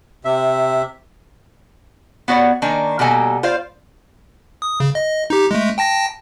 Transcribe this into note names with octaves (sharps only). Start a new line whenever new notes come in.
C3 E5
B3 F#4 C#5 D5
D#3 A#3 D4 G#5 A#5
B2 G3 A#3 A4 G#5 A#5
F4 C5 D5 F5
D#6
C#3
D#5
D#4 G4
G#3 A3
G5 A5 A#6